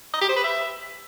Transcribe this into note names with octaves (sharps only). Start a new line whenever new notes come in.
D#5
G4
C5
B4
E5